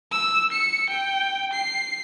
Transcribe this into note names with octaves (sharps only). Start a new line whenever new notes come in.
E6
C#7
G5
C7